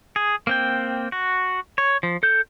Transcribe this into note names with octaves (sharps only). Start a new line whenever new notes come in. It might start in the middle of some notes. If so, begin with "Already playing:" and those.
G#4
A#3 C4 G5
F#4
C#5
F3
A4 G6